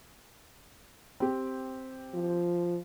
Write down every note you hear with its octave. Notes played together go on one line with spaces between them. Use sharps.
C4 G4
F3